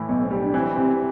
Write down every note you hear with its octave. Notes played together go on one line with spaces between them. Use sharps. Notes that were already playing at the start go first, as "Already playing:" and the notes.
Already playing: A2 E3
B1 B3
C4
G3
D4
E3 C4
C3